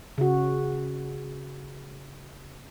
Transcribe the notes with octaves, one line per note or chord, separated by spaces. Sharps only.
C#3 F#4